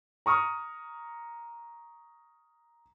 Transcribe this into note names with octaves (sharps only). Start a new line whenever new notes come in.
A#5 C#6 D#6 F6